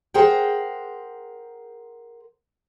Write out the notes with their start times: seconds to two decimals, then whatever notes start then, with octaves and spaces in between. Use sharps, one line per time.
0.14 G#4 A#4 C5 F#5 G5